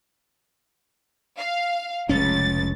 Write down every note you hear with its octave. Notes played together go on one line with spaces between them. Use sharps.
F5
F1 C#2 C#4 A6